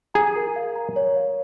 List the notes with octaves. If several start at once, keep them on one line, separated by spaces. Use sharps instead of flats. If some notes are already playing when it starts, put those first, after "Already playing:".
G#4 A#5
A#4
F5
A#5
C#5
F5